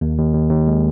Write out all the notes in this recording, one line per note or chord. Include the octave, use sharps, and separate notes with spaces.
D#2
D#2
D#2
D#2
G#3